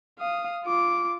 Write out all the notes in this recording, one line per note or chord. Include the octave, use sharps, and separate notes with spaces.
F5 D#6
F4 D6